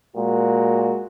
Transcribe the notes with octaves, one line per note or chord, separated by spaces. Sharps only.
A#2 G#3 F#4